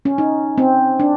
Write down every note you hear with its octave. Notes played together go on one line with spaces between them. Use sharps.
C#4
D#4
C4
D4